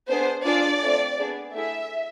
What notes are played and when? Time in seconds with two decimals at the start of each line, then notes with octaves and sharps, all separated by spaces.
0.09 B3 D4 G#4 C5
0.45 D4 F4 G#4 D5
0.82 A3 C4 F4
1.19 B3 D4 G#4
1.54 A3 E4 G#4 E5